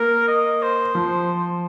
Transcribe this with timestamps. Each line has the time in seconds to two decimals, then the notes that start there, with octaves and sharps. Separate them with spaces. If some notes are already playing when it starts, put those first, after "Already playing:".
Already playing: A#3 A#4
0.28 D#5
0.62 C5
0.95 F3